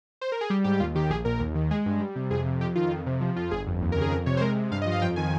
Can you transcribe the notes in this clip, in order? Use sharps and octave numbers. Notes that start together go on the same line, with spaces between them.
C5
A#4
G#4
G3 G4
G#2 G4
D#2 F4
D#3 G4
A#1 G#4
A#2 A#4
D#2
D#3
G#3 G#4
G2
G3
C3
F2 G#4
C3
F2 G4
D#3 F4
F2
C3
F3
F2 F4
G1 G#4
F2
D#2
A#4
C#3
G#4
F2 A#4
C3 C#5
C5
G#3 A#4
C3
G2 F5
D#5
F3
F5
F2 G5
D#3 G#5